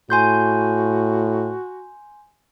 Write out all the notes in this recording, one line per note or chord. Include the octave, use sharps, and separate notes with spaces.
A2 F#4 G#5 C6 G6